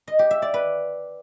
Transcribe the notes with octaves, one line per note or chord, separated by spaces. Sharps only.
D#5
G4
E5
D5
B4